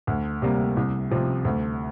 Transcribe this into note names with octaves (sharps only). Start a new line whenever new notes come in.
D2
C3 G3 A#3
C2
C3 F3 C4
D2